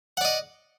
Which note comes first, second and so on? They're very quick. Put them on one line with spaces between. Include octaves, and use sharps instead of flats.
F#5 D5 D#5